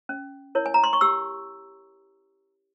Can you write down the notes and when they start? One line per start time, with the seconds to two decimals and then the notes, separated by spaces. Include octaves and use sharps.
0.09 C#4
0.55 E4 A#4 C#5
0.66 G#5
0.74 A#5
0.84 C6
0.93 C#6
1.01 G4 E6